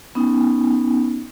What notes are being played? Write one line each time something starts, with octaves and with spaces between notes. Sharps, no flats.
B3 C#4 D#4